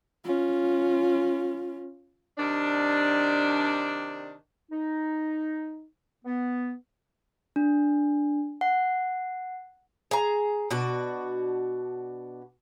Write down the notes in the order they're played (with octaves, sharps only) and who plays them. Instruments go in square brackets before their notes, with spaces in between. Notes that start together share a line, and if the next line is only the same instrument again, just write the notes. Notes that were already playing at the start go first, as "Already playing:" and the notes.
[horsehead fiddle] C#4 F4
[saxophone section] C3 D#3 D4
[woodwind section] D#4
B3
[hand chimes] D4
F#5
[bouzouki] G#4 A#5
B2 D4 F#4